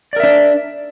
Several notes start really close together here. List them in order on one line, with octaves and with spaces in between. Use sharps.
D5 A#4 E5 D4